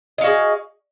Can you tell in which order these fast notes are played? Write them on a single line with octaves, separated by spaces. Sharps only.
D#5 F5 F#4 G#4